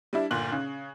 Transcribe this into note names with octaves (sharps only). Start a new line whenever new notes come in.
G3 D4 E4
G1 A#2 F#6 F#7
C#3